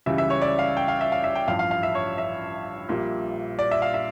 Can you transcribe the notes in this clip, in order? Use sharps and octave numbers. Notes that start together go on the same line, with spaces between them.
C#2 C#3 E3 G3 E5
E5
C#5
D5
F5
G5
F5
E5
F5
E5
G5
A1 G2 F3 F5
F5
F5
E5
C#5
E5
A#1 A#2 G3
D5
E5
F5
E5